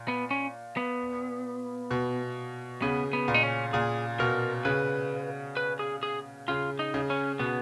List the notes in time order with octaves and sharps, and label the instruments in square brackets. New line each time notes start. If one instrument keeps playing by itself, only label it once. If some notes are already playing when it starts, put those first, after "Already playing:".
Already playing: [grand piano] A#2
[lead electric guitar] B3
C#4
B3
[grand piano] B2
[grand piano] C#3 [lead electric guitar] B3
[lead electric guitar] B3
[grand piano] A#2
[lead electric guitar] D#4
C#4
[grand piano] A#2 [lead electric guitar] G#4
[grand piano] B2 [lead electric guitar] A#4
[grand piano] C#3 [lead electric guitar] B4
[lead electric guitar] B4
G#4
G#4
[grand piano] C#3 [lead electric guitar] F4
[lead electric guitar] D#4
[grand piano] C#3
[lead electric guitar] C#4
[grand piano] B2 [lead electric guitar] B3